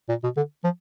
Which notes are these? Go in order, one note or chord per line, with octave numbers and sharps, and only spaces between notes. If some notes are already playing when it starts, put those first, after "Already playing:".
A#2
B2
D3
F3